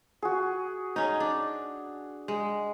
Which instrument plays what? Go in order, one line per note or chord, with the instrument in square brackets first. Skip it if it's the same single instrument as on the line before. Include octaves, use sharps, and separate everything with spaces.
[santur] F#4 G#4
[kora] C#4 D#4
D4
G#3